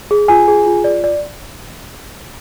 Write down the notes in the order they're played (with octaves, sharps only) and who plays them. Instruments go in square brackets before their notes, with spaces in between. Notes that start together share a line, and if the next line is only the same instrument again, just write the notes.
[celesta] G#4
F4 G#5
G#4
F4
D5
D5